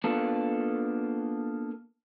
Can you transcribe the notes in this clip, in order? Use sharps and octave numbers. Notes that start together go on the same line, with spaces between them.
A#3 B3 D4 F4 A4